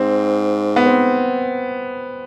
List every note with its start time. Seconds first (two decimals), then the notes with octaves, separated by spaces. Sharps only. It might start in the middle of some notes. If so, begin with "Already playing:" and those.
Already playing: G#2 C4
0.76 B3
0.86 C4